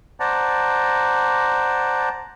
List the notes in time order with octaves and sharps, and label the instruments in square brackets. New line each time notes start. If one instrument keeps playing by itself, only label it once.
[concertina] C5 D5 F#5 A5 A#5